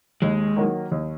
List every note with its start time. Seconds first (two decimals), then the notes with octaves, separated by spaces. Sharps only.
0.22 D#2 G#3
0.57 D#3 F#3 A#3
0.91 D#2